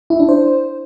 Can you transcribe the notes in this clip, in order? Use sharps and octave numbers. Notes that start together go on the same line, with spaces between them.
E4
D4
C5